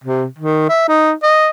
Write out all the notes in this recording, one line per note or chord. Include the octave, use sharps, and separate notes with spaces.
C3
D#3
E5
D#4
D#5